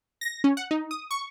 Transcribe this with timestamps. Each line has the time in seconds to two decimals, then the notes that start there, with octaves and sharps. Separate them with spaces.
0.21 A#6
0.44 C#4
0.57 F#5
0.71 D#4
0.91 D#6
1.11 C#6